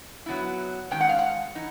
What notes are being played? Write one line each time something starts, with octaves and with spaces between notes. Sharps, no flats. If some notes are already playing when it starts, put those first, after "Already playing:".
F#3 B3 E4
D#3 G#3 C#4 G5
F#5
F5
F#5
E3 D#4